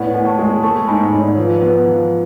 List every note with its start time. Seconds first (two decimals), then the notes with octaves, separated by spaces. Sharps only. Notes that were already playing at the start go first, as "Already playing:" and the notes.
Already playing: A2 B3 D5 F#5
0.14 A2
0.26 A5 C#6
0.39 G#3
0.63 A3 A5 C#6
0.87 G#2 G#5 B5
1.12 G#2 C#5
1.21 D5
1.29 C#5
1.37 F3 B4
1.61 B3
1.86 F3